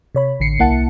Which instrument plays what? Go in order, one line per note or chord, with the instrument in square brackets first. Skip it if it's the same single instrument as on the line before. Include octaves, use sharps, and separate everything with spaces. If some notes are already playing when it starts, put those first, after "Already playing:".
[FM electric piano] C3 C#5 B5
A1 D3 C7 C#7
C2 A#3 E4 F#5 A5 C#7